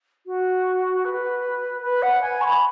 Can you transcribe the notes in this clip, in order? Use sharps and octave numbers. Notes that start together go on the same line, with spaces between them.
F#4
B4
B4
F#5
G#5
C#6
B5